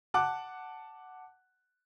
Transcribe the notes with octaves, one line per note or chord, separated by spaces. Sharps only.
F#5 A5 D6 F#6